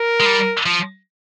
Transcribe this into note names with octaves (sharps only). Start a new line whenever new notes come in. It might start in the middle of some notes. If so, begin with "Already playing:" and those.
Already playing: A#4
G#3
G3
F3